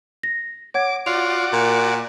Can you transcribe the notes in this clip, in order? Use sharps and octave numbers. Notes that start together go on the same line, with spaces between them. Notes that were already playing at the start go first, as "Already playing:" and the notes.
A#6
C#5 F#5 D6 G#6
F4 F#4 D5 F7
A#2 A#4